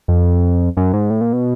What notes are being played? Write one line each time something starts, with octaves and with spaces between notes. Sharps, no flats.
F2
F#2
G#2
A2
A#2
B2